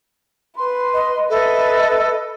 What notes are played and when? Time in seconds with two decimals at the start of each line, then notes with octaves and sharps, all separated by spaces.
0.57 B4 C6
0.93 D#5
1.30 A4 B4 D#5 E5